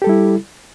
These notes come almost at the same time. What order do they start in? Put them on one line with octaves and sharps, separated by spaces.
G4 A4 G3 E4